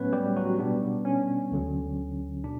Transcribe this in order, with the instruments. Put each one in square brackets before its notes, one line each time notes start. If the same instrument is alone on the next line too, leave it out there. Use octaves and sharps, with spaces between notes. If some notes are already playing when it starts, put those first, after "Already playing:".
Already playing: [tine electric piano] A2 F#3 A3 B3 C#4 B4 C#5
G3 G4
F#3 F#4
B2 G3 B3 D4
C#4
D2 D3 F#3
B2 D4